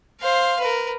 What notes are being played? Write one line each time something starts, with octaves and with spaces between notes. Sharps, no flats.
C5 F5
A#4 B4